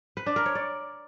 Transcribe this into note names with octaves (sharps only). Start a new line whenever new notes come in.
B4
D4
A#4
C#5
D5